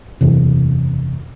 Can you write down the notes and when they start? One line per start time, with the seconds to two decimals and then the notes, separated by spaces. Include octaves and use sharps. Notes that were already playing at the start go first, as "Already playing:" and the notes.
0.21 F#1 E2 C3